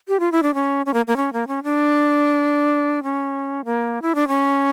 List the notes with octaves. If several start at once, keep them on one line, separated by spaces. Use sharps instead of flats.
G4
F4
E4
D4
C#4
C#4
A#3
A#3
C#4
A#3
C#4
D4
C#4
A#3
E4
D4
C#4